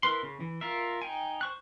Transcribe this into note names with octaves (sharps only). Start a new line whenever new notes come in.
E4 A#4 B4 C6
C#3
E3
F4 A#4 E5
D#4 G5 G#5
C5 C#6 F#6